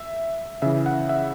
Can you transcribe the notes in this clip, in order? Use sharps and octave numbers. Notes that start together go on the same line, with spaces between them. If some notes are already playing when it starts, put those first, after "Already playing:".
Already playing: E5
C#3 E3 E5
F#5
E5